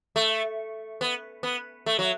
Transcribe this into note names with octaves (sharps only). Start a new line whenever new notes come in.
A3
B3
B3
A3
F#3